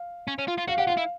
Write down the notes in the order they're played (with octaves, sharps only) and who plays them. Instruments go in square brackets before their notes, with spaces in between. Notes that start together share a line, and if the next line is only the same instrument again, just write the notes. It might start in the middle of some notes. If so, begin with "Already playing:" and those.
Already playing: [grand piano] F5
[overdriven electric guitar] C#4
C#4
F4
F4
[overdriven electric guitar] F#4 [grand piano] F5
[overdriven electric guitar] G4 [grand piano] F#5
[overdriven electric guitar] F4 [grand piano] F5
[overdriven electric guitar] E4